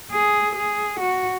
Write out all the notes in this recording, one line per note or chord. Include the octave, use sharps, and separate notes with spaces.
G#4
G#4
F#4